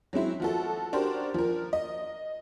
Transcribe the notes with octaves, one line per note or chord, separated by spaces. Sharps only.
F#3 G#3 C4 E4
F3 F#4 A4
D4 F#4 G4 A#4 C5
F3 A#4
D#5